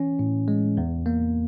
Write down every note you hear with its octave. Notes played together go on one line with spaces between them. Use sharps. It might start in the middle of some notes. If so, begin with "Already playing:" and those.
Already playing: E3 C#4
A2
G#3
E2
A#3